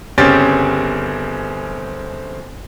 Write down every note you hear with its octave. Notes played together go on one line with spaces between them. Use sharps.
G1 C#3 C4 C#4 G4 A6